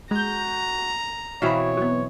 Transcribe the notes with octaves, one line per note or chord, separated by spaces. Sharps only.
G#3 F#4 A#5 G6
B2 E3 C4 C#5 F5 B5
F#3 B3